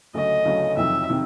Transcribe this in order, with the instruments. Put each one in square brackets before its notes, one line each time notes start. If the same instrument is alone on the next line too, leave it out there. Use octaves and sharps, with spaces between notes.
[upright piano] D2 C#3 F#3 A3 [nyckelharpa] D#5
[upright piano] D2 C#3 F#3 A3
[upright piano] F2 C3 D#3 F#3 [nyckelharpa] E5
[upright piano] C3 D#3